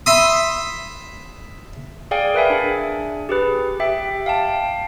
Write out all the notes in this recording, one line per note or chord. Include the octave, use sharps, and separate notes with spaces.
E5 B5 C6 D#6
G#4 D5 F5 G5 G#5
A#4 B4 E5 G#5
D4 G#4
G4 G#4 B4
G4 E5 G5
F5 G5 A5